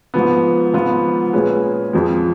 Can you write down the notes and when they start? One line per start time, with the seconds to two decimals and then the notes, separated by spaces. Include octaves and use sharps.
0.14 G#2 F3 B3
0.74 G#2 F3 B3 F4 B4
1.33 A#2 G#3 C#4 G#4 B4
1.93 F2 F3 G#3